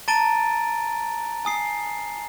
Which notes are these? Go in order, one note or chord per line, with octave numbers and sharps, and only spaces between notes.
A5 A#5 A6 D7 D#7 G7
G#5 D#6 C7